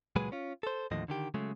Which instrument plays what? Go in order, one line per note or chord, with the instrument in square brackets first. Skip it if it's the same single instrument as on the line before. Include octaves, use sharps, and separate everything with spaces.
[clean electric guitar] C#2 A#2 F#3 G#3 G#4 B4
C#4 F4
A4 C5
D#2 A2 D3 F3 D#5
D3 D#3 G4
C#3 F#3 G#3 A3